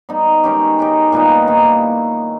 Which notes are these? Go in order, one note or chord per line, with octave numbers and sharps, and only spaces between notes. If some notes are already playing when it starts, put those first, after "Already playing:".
G3 B3 D#4
D#3 G#3 C#4 G4
G#3 D#4 G4
A#2 G3 B3 D#4
D#3 A#3 E4